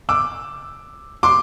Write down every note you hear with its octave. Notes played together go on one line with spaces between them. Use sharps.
D6 E6
C6 D6